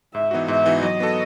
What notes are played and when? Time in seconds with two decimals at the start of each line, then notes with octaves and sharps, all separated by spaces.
0.14 G#2 E5
0.31 E3 B3 D#4 F#4
0.48 G#2 E5
0.66 E3 B3 D#4 F#4
0.82 F#3 D#5
1.00 B3 F#4 A4